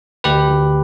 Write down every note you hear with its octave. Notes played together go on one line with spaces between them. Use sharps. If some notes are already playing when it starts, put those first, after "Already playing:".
D2 G4 B4
D2